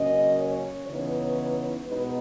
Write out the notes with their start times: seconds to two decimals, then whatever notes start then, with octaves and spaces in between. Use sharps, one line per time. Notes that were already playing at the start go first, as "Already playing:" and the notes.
Already playing: C#3 F#3 A#3 C#4 D#5
0.40 C#5
0.88 C#3 E3 B3 D#4 C#5
1.87 B2 G#3 B3 D#4 B4